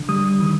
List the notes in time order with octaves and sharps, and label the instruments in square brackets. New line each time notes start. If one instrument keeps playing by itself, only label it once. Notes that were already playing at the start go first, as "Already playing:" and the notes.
Already playing: [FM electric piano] D3
G3 D#6
D#3